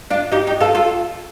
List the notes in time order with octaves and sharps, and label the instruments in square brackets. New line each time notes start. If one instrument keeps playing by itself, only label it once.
[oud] D4 F4
D#4 G4
D#4 G4
F4 A4
F4 A4